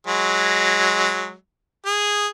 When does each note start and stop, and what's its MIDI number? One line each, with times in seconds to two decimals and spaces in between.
0.07 1.34 54
0.07 1.34 56
1.86 2.27 68